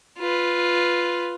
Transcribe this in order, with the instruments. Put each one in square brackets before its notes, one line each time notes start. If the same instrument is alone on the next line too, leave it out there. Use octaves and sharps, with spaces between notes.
[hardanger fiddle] F4 B4